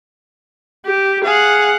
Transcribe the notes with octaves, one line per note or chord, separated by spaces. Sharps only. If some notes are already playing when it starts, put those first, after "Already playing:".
G4
G#4 F5 F#5